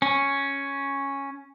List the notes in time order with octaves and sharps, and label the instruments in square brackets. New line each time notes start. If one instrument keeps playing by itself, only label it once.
[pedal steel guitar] C#4